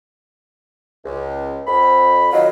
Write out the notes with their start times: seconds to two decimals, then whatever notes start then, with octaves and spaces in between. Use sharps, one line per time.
1.05 C#2
1.67 F2 B5
2.33 D#3 F#3 F4 D#5